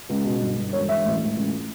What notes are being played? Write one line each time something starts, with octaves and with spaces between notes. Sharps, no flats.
C#2
B2
G1
G1
E1 C#5
E1 E5
A1
A1
C#2